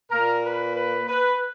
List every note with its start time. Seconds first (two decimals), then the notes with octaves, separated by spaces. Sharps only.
0.10 A#2 A#3 A#4
0.44 B4
0.75 B4
1.08 B4